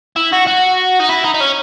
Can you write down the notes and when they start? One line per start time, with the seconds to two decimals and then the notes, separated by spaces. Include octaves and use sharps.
0.16 E4
0.32 F#4
0.47 F#4
0.99 D#4
1.09 E4
1.24 D#4
1.34 D#4
1.40 C#4